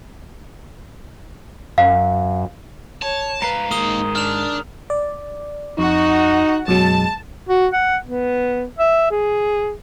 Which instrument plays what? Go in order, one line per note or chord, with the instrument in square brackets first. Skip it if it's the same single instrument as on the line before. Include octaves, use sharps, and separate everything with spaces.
[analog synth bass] F#2 [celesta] F5
[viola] C#5 [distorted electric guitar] A5
[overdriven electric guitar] G#2 F5 [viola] B4 [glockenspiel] A#5
[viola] D#3 G#3 [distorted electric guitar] A#3 D#4 [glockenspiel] D#6 G7
[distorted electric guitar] D4 [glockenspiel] F6 F7
[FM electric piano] D5
[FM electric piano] F2 [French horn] D#4 [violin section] F#4 F#5
[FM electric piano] F#2 B2 F#3 [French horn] G#3 [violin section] A5
[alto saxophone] F#4
F#5
B3
E5
G#4